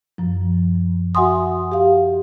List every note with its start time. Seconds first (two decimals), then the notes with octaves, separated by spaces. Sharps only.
0.18 F#2 F3
1.15 F#4 E5 F#5 G#5 C6 D#6
1.72 G4 F5